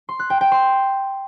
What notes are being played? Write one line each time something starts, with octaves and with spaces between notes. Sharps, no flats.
C6
F#6
G5
G5
C6